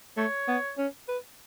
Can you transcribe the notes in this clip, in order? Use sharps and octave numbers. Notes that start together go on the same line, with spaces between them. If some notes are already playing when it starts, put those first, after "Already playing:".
A3 C#5
B3
C#4
B4